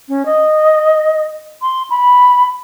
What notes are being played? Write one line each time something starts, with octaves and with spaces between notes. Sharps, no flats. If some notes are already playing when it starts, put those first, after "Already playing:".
C#4
D#5
C6
B5